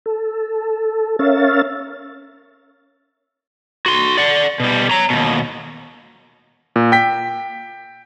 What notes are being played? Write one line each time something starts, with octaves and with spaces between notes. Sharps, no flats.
A4
C#4 A#4 C#5 E5 F5 A6
F#4 C6
D5 F#5
B2 G3
C#5 A#5
D#2 B2
A#2
G5 B6